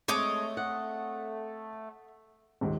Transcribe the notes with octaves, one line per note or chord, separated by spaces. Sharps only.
G#3 A3 C4 C#5 D#5 D6
F#5
D#1 G#2